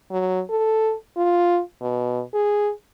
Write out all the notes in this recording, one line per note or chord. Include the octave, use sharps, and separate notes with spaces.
F#3
A4
F4
B2
G#4